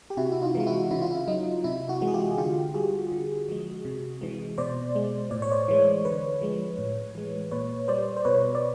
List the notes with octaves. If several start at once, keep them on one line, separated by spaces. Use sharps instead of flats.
G4
C3 E4 F#4
E4
D#4 F4
E3 G#3 F4
E4 F#4
C#3 E4
F4
E4
F#3 D#4
C3 E4
E4 F#4
E3 G#3
G#4
F4 G4
G#4
D3 F4 G4
G3 F#4 G#4
D3
F3 G#3
C3
E3 G#3
B2 C5 D5
G#3
A2 D5
C#5
C5 D5
E3 G#3
D3 B4 C#5
F3 G#3
A2
E3 G#3
A#2 B4 C#5
G3 C5 D5
C5
B2 B4 C#5
D5